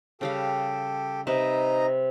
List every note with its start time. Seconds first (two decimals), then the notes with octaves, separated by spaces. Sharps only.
0.21 C#3 G3 G4 A4 F5 G5
1.27 C3 C4 D#4 B4 D#5 A#5